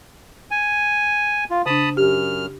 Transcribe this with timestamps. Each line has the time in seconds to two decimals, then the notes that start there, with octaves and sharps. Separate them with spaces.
0.51 G#5
1.50 F4
1.66 C#3 D4 A5 B5 D#6
1.97 F#2 G4 F6